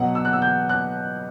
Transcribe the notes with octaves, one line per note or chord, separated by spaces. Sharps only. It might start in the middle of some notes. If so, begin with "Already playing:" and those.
Already playing: B2 F#3 B3 F#5
E6
F#6
E6
G6
F#6